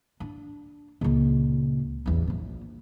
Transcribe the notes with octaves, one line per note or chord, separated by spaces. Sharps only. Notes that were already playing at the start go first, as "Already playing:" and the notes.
D4
C#2 A#2
A1 E2
A#1 A#2